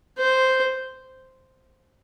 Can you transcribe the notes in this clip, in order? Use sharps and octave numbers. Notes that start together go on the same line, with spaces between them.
C5